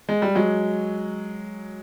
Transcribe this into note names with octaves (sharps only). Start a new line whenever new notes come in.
G#3
G3
F#3 G#3